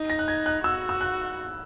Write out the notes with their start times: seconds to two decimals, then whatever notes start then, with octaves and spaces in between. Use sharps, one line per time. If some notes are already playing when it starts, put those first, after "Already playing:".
Already playing: D#4
0.10 A#6
0.19 F#6
0.28 G#6
0.46 F#6
0.64 F#4 E6
0.89 E6
1.01 F#6